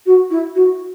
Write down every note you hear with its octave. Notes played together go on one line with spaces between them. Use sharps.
F#4
E4
F#4